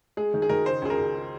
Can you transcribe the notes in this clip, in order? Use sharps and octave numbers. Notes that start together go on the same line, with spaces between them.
G#3 G#4
D#3
G#4
D#3 A#4
C#3 C5
C#2 G#4
A#4
C#2